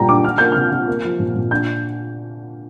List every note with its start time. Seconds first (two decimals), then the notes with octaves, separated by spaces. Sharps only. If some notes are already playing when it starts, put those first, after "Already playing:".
Already playing: A#2 G3 G5 A#5
0.08 D4 D6
0.24 D4 F6
0.38 A#3 G6
0.52 C3 F6
0.72 C3
0.87 A#3
1.04 F3
1.19 A#2
1.36 A#2
1.51 D4 G6